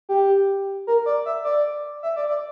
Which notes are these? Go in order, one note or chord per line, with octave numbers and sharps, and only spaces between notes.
G4
A#4
D5
E5
D5
E5
D5
D5